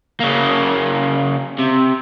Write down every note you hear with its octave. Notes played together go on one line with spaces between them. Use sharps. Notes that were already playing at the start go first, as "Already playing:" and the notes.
C#3 A#3
C3